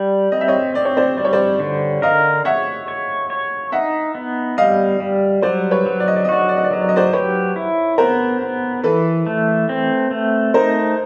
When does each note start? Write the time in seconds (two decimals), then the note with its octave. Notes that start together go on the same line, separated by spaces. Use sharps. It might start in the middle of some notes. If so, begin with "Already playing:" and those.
Already playing: G3
0.32 C4 D#5
0.41 E5
0.48 C#5 D#5
0.74 C4 D5
0.85 C#5
0.97 C5 D5
1.17 G3 D5
1.25 C#5
1.33 C5 D5
1.60 D3
2.02 A#4 D#5 F5
2.45 C#5 E5 F#5
2.88 C#5
3.30 C#5
3.72 D#4 E5 F#5
4.15 B3
4.58 G3 D#5 F5
5.00 G3
5.42 F#3 C5 D5
5.71 B4 C#5
5.86 F#3
6.00 D5
6.08 D#5
6.16 D5
6.24 D#5
6.29 F#4 D5
6.39 D#5
6.49 D5
6.57 D#5
6.64 D5
6.71 F#3 D#5
6.81 D5
6.89 D#5
6.96 C5 D5
7.13 G4 B4 C#5
7.56 E4
7.98 B3 A#4 C5
8.41 B3
8.84 E3 A4 B4
9.26 A3
9.69 C4
10.11 A3
10.54 D#4 A#4 C5